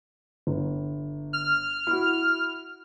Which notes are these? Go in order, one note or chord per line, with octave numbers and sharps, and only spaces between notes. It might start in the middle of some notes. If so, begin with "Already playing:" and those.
G1
F6
E4 F#4